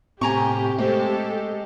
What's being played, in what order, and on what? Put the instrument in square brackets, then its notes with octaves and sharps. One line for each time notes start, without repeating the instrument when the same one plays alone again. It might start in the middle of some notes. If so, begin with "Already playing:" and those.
[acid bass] A2 [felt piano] C3 [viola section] G4 [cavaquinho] G#5 A#5 C#6
[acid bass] G#3 [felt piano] A3 C5 [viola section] G4 A4